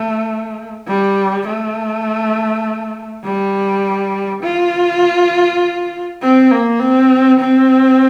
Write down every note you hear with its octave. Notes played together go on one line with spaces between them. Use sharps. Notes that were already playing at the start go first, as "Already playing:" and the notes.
Already playing: A3
G3
A3
G3
F4
C4
A#3
C4
C4